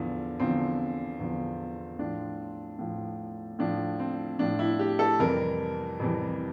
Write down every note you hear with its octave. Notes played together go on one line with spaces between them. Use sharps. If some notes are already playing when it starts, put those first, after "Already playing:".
Already playing: E2 D3 F3 E4
E2 D3 F3 C4
E2 D3 F3
A2 F3 D4
A2 F3
A2 F3 D4
C4
A2 F3 D4
E4
G4
A4
F2 C3 E3 G3 A#4
F2 C3 E3 G3